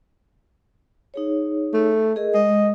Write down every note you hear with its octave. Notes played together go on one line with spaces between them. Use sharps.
D#4 G#4 C#5
A3
G#4 A#4 D#5
G#3 D#5